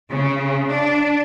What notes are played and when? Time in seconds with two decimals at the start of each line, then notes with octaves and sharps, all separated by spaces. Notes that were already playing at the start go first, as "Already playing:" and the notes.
0.10 C#3
0.69 D4